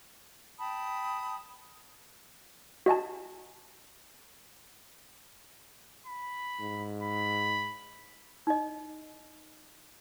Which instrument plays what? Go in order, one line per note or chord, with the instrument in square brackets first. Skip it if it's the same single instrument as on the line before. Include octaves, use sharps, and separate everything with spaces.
[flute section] G5 A5 B5 D#6
[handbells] F#4 D#5 G#5 A5
[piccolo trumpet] B5
[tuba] G#2
[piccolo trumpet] B5
[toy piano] D#4 D#5